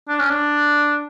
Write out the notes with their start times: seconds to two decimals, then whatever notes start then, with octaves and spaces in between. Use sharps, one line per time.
0.09 D4
0.19 C#4
0.29 D4